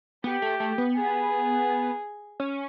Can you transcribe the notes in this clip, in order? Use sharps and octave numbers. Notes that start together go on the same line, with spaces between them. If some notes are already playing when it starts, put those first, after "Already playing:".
B3 G4
A3
A3
B3
G#4
C#4